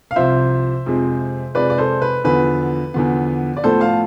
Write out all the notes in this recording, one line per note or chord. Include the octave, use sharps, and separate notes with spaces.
F5
C2 C3 F3 C5 E5
F2 C3 G#3 C4
F2 C3 G#3 C4 B4 D5
D5
A4 C5
B4
E2 D3 F3 B3 B4
E2 D3 F3 B3
D5
A2 F3 B3 A4 C5
F5 A5